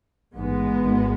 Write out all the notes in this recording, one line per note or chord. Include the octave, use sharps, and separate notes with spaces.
A1 G#2 G#3 B3
G#1 G#2